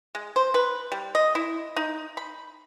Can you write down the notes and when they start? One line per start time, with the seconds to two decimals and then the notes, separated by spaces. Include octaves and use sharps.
0.15 G#3
0.36 C5
0.54 B4
0.92 G3
1.15 D#5
1.35 E4
1.76 D#4
2.17 B5